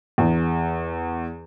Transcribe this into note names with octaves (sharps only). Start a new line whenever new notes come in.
E2